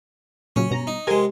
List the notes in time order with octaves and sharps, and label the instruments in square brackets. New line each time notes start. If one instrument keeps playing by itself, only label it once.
[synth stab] A#2 C#3 F#3 [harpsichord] C#4
[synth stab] G2 B2 A#5
[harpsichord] D#4
[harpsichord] C3 G#3 [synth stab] G#4 A#4 G#5